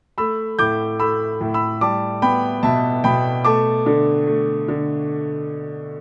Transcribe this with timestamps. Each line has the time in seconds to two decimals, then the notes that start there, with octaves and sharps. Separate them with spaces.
0.18 A3 B5 E6
0.59 A2 D6 G6
1.00 A3 B5 E6
1.41 A2
1.54 B5 E6
1.81 G3 A5 D6
2.22 B3 G5 B5
2.63 B2 E5 A5
3.04 B2 G5 B5
3.45 A3 A5 D6
3.86 D3
4.27 A3
4.68 D3